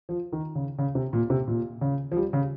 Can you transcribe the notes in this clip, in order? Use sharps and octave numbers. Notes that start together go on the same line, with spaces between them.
F3
D#3
C#3
C#3
C3
A#2
C3
A#2
C#3
F3
G3
C#3